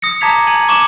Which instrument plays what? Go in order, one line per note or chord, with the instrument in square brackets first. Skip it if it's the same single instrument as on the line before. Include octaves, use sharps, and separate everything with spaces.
[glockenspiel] D#6 A#6 C#7
A5 A#5 D6 G#6 B6 F7
G#5 A#5 G#6 D#7 F#7
C#6 D6 C#7 E7 F#7